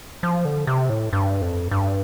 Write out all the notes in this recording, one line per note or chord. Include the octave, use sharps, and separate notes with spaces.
F3
D3
C3
A2
G2
F2
G2